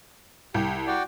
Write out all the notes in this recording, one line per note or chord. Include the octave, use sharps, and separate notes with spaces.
C2 G4
F#4 D5 G5